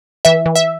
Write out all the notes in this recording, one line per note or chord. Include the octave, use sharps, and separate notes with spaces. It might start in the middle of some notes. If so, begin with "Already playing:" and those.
E3 E5
E3
E5